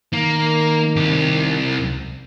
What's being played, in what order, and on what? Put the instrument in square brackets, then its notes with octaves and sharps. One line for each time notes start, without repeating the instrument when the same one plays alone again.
[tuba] D#3 [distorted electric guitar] A#3
[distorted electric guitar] C2 G4